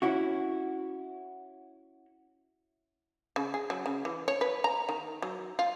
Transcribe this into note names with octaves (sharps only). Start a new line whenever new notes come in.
C#4 E4 F#4
C#3
G#4
F#3
C#3
E3
C#5
B4
A#5
D#3
F#3
F4